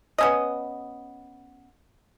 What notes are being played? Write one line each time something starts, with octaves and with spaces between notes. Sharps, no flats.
B3 C#4 D#5